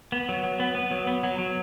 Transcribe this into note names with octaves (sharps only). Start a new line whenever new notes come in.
B3
F#3
F#3
B3
B3
F#3
B3
F#3
F#3